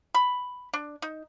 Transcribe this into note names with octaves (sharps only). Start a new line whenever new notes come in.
B5
D4
D#4